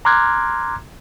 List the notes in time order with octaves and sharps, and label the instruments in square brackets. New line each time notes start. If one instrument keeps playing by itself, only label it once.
[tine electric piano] A#5 C6 D6 F6 F#6 G#6